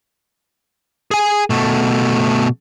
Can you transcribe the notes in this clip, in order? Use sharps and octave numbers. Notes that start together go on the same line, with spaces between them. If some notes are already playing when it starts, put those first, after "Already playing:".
G#4 G#5
B2 A3